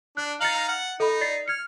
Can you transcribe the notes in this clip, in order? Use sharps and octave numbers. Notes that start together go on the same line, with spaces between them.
D4 F#6
D#4 F5 A#5 A6 C#7 F#7
F#5
D#4 A4 D#5 B5
D5 A6 C7
F6 G#6 C#7